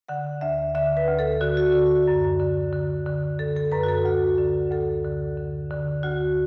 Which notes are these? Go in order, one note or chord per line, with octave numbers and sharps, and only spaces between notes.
D3 F#5
D2 E5
D3 E5
B4
D2
A4
D3 F#4
F#4
D3
F#2
D3
D3
D3
D3 A4
A4
F#2 B4
F#4
A4
D2 F#4
D3
D2 A4
D3
D3
D3
D2 F#4